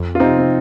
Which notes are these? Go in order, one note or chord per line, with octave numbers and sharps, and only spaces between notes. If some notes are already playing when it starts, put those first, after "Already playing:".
Already playing: F2
F4
C3 C4 D#4
C4